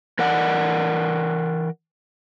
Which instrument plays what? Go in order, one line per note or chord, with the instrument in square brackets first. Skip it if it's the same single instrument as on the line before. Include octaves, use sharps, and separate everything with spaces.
[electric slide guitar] E3 A#4 D5 F#5